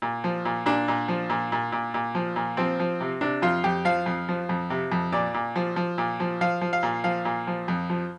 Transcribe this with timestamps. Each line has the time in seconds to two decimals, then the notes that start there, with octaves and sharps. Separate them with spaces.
0.02 A#2
0.24 F3
0.45 A#2
0.66 A#2 D4
0.88 A#2
1.08 F3
1.30 A#2
1.52 A#2
1.72 A#2
1.94 A#2
2.15 F3
2.36 A#2
2.57 F3 C4
2.80 F3
3.01 C3
3.21 C3 D4
3.42 F2 F4
3.64 F2 G4
3.85 F3 F5
4.06 F2
4.29 F3
4.49 F2
4.70 C3
4.92 F2
5.12 A#2 D5
5.34 A#2
5.56 F3
5.76 F3
5.98 A#2
6.20 F3
6.41 F3 F5
6.61 F3
6.73 F5
6.83 A#2
7.04 F3 F5
7.25 A#2
7.47 F3
7.68 F2
7.90 F3